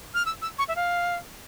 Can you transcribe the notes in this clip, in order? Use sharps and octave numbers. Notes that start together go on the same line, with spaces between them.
F6
E6
E6
C#6
E5
F5